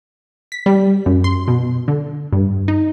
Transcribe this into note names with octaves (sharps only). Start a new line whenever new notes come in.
B6
G3
F#2
C6
B2
D3
G2
D#4